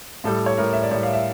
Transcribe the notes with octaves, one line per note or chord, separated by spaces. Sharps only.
A2 G3 A4
C#5
A2 G3 A#4
E5
D5
A2 G3 C#5
F5
E5